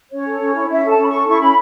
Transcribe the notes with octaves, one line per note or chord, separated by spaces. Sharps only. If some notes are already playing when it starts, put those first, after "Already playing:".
C#4 C#5
A4
C#4
E4
C#4 E5
A4 A5
C#4 B5
A4 C#6
E4 C#6
C#4 B5